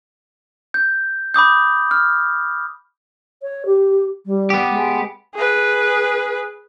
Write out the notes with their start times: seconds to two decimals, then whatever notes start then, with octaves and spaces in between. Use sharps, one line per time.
0.74 G6
1.34 B5 D6 D#6 G6
1.91 F6
3.42 C#5
3.66 G4
4.26 G3
4.50 B3 G4
4.70 G#3
5.35 G#4 B4